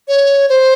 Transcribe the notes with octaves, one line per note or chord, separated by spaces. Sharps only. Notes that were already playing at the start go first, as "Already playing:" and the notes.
C#5
C5